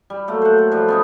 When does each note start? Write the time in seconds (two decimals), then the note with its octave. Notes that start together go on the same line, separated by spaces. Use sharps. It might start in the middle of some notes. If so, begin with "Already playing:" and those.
0.10 G3
0.28 F#3 A3 A#3
0.42 C5 F#5
0.58 A4
0.72 F3 G3
0.88 B3 C#4 D#4